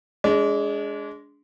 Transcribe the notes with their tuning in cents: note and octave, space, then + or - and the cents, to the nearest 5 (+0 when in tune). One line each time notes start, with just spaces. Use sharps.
G#3 +0 D4 -30